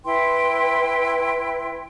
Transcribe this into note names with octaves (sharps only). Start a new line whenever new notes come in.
E4 B4 G5 C6